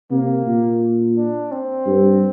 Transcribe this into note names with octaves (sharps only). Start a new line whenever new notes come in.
C3 A#3
A#2
D4
C4
G2